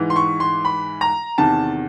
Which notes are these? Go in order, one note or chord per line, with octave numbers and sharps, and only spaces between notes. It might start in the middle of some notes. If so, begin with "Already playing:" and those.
Already playing: G#2 E3
C6
C#6
C6
B5
A#5
E2 C3 D#3 A5